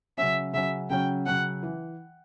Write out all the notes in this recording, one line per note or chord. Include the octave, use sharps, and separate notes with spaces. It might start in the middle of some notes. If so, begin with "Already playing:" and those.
C#3 F#3 C#4 E5
C#3 F#3 C#4 E5
C#3 F#3 C#4 G5
C#3 F#3 C#4 F#5
E3